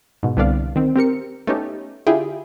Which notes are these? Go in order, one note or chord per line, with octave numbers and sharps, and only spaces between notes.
G#2 B2
C2 D3 B3 D4 D5 F5
D#3 C4
C4 G4 A#4 C#7
A3 B3 C#4 D#4 G4
D3 E4 F4 G4 G#4